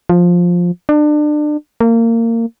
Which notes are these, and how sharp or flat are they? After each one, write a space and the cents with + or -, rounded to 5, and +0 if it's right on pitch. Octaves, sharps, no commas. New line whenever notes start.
F3 +10
D4 +30
A#3 -25